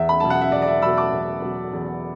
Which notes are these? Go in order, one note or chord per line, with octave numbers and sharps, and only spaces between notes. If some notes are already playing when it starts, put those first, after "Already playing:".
Already playing: E2 E5
B5
B2 F#3 A5
F#5
E5
E2 D5
D5
E5
B2 F#3 B5 E6
A5 D6
E2
B2 F#3
E2